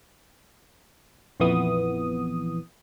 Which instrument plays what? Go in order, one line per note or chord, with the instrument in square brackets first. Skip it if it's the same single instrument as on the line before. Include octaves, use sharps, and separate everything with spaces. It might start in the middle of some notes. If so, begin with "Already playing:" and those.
[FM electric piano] A#1 F2 E3 B3 D#6